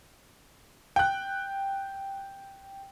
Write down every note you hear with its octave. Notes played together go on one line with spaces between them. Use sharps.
G5 F#6